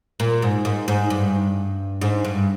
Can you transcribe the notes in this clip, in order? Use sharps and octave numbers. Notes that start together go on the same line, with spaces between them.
A#2
G#2
G#2
G#2
G2
G#2
G2